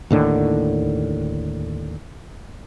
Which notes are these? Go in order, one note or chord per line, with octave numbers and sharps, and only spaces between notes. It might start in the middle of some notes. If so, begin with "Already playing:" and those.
D#2 A2 D3 D#3